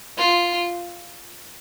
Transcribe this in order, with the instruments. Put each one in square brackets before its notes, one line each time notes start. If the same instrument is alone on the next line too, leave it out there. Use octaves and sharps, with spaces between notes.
[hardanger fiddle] F4